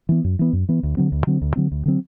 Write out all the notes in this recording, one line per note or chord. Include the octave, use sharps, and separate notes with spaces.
E3 B3
F#2
E3 B3
F#2
E3 B3
D2
D3 F#3 C4
D2
D3 F#3 C4
D2
D3 F#3 C4
D2
D3 F#3 C4